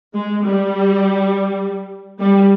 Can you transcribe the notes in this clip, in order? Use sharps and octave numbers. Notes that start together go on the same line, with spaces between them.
G#3
G3
G3